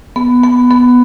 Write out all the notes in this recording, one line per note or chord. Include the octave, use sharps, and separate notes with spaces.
B3
B3
B3